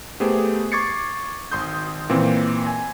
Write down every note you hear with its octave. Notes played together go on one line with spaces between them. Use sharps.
A3 B3 G4 G#4 C5
C#6 D6 G#6 A6 C7 C#7
G#1 C6 D#6 G6
A#2 E3 A#3 C4
G#5